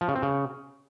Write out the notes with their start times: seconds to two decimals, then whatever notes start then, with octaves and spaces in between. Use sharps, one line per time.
0.01 F3
0.08 C#3
0.15 C4
0.23 C#3